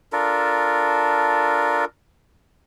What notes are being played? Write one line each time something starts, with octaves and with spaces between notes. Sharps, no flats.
D4 F4 A4 A#4